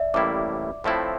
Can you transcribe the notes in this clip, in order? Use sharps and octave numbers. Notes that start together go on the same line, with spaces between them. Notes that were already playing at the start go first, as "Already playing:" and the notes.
Already playing: D5 E5
A1 A2 G3 A#3 E4 D6
A2 F3 A3 C4 E4